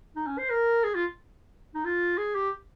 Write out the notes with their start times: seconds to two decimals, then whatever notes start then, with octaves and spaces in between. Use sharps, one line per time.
0.16 D#4
0.27 C#4
0.38 C5
0.50 A#4
0.84 G#4
0.95 F4
1.75 D#4
1.84 F4
2.18 G#4
2.35 G4